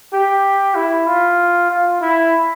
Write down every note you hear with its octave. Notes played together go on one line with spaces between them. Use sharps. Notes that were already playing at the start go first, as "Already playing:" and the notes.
G4
E4
F4
F4
E4